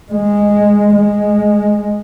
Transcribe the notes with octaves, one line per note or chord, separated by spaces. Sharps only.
G#3
G#3